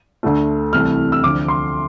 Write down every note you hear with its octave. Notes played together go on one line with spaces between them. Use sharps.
D2 D3 A3
C2 C3 E3 A3 F6
E6
D2 D3 F3 A3 D6
C6